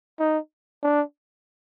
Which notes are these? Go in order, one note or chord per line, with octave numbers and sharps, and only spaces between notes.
D#4
D4